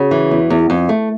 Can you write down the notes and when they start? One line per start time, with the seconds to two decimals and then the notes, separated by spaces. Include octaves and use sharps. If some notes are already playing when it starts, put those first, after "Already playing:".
Already playing: C#3 F#4
0.11 E3
0.31 E2
0.50 E2
0.70 F2
0.89 A3